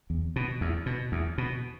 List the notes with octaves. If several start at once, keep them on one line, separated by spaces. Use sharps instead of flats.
E2
B2
E2
B2
E2
B2